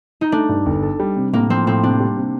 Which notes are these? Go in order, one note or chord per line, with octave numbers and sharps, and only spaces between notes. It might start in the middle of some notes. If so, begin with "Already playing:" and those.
D#4
A3 D4
G2
G1
A4
G3
C3
A2 A#3
F3 C4
A2 C4
C3 D4
G3
C3